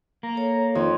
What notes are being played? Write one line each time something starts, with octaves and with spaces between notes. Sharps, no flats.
A#3 A#5
A4 C#5
F2 D#3 F4